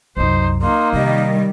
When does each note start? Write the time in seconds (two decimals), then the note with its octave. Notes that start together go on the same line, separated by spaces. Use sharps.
0.17 C2 F#2 D#4 C5
0.62 A#3 D#4 C6
0.93 C3 D#3 G3 D#5